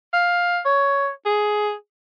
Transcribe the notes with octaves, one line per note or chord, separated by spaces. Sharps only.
F5
C#5
G#4